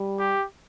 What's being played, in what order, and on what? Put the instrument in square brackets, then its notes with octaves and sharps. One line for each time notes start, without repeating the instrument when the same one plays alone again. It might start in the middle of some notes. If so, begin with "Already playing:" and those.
Already playing: [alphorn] G3
[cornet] G4